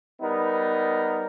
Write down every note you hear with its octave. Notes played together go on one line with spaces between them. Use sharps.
G3 B3 D#4 A#4